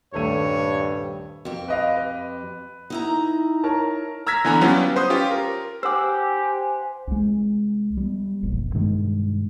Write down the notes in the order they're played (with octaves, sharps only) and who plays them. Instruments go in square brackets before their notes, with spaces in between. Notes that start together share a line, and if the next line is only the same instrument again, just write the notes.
[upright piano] D#1 A3 D#7 [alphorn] G2 [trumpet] C#5
[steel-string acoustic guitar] F2 G4
[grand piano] B4 D#5 F5
B4
[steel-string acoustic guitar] D#4 E4 A#5
[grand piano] A#4 C#5 A5
[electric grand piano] A#5 E6 F6 G#6 A#6 B6
D3 E3 B3 G#5 A#5 B5
F#3 G3 B3 C#4 E4 F4
B4 C5 C6 D#6
C#4 F4 G4
A#4
[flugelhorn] G4 [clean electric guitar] C5 F#5 [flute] G#5 [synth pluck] D6 E6
[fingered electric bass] C2 G#3
G3 B3
E1 A#1 F2
G2 B2 D#3 G#3